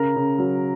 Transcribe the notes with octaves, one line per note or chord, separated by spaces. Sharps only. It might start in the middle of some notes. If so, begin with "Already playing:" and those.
Already playing: C#3 A#4 A#5
C#3
F#3